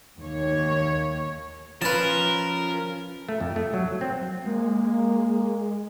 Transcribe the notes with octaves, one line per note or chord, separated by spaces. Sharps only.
D#2 C#5
F3 C#4 F4 A#4 B4 A5
A3
F2
A3
F#3
C4
G#3 A#3